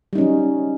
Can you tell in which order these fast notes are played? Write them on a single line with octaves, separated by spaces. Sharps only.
G3 D#4 C#4 F#3